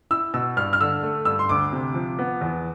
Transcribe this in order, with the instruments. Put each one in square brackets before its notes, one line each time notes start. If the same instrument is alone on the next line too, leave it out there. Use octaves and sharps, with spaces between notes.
[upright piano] E4 E6
B2 E6
G2 F6
F6
D3 E6
A3
G2 E6
C6
D2 D6
C3
F3
B3
E2